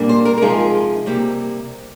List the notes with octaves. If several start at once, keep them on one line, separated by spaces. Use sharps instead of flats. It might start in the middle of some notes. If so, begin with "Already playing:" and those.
Already playing: A#2 G3 A#3 D4
C5
A#4
A#4
C3 F3 G#3 D#4 G#4
C3 G3 A#3 G4